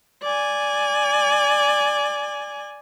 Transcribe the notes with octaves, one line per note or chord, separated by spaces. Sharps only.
D5 G#5